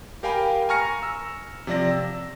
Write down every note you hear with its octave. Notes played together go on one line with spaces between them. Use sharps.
G4 A#4 F5 G5 G#5 B5
G#5 A#5 C#6 F6 A#6 C#7
E6
C3 F3 D5 A#6
E6